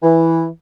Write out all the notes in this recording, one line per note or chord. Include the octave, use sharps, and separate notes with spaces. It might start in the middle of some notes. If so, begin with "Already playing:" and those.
E3